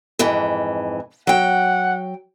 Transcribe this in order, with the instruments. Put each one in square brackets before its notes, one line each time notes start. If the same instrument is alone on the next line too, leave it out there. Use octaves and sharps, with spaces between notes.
[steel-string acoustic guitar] F2 G#2 E3
[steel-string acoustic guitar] F#3 G5 [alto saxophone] F#5